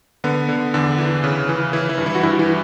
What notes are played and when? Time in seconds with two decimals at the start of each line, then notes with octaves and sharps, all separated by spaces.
0.24 D3 B3
0.49 D3
0.74 E2 D3 D4
0.98 E3
1.24 C#3
1.49 E3
1.73 E3 E4
1.89 E3 E4
1.98 G2
2.06 E3 E4
2.15 F#4
2.23 G2 E3 E4
2.39 E3 E4